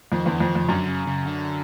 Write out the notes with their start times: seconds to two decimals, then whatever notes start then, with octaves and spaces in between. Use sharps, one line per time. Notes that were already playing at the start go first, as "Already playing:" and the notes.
0.12 F2 D#3
0.25 E2 D3
0.38 F2 D#3
0.55 F2
0.64 C#3
0.69 F#2 D3
0.88 C#3
1.07 C#3
1.26 D3